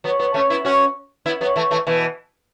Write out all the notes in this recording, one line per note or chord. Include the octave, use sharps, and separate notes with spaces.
F#3 B3
F#3 B3
A3 C#4
B3 E4
C#4 F#4
B3 E4
F#3 B3
E3 A3
E3 A3
B2 E3